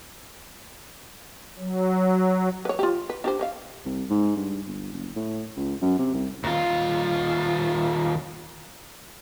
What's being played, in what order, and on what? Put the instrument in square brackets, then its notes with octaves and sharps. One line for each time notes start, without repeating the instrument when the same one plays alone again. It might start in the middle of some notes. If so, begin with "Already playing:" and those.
[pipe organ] F#3
[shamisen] B4 C#5
F4 G4
B4
D4 G4 C5
B4 C#5 F5
[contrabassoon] C2
G#2
G2
G1
F#1
A2
C#2
F#2
C3
C2
[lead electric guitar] D#2 F4